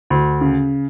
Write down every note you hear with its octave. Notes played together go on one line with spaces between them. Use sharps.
D2
C#3